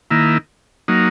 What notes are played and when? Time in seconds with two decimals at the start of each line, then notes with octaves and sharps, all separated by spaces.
0.11 D#3 A#3 E4
0.88 F#3 A#3 D#4